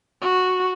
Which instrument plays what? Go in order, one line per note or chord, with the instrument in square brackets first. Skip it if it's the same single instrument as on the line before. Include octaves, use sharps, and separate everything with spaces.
[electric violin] F#4